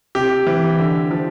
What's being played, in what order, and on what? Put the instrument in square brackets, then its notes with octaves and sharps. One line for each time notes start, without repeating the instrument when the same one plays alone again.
[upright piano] C3 [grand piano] G4
[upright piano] E3
D3
F3